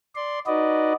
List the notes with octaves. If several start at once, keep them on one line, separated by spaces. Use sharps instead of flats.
D5 C6
D#4 F#4 B4 D5 D#5